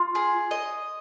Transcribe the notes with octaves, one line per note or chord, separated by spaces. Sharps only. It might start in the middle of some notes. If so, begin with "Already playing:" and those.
Already playing: F4
G#4
D#5